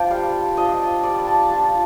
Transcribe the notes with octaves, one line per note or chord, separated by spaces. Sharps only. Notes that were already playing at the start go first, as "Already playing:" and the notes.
Already playing: D4 F4 C5 G5
G3 F5
D4 F4 D#5
G3 D5
A5
D4 F4 A5